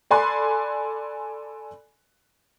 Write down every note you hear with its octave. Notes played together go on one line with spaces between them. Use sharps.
A4 D5 G#5 B5 C6 F#6